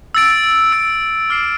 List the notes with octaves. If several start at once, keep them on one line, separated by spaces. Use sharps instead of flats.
E6 A6 D7
E6 A6 D7
D6 F6 C7 E7